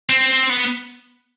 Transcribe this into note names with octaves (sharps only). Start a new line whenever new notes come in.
C4
B3